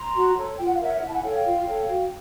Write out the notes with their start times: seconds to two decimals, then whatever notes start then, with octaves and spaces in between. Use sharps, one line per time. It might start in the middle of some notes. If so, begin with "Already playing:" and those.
Already playing: A#5 C6
0.14 F#4
0.36 A4 C#5
0.58 F4 G5
0.66 F#5
0.74 F5
0.80 A#4 C#5 E5 F#5
1.01 E4 E5 F#5
1.08 A5
1.12 F#5 G#5
1.23 A4 C#5 F5 G5
1.34 F5 G5
1.45 F4
1.67 A4 C#5
1.89 F#4